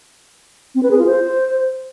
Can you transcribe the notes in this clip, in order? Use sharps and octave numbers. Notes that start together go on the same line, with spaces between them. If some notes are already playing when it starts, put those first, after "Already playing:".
C4
B4
G#4
F4
C5